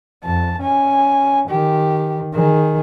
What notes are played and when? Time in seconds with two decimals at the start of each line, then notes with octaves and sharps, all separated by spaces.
0.24 F2 A5
0.62 C#4 G#5
1.49 D#3 G4
2.35 D#3 G#4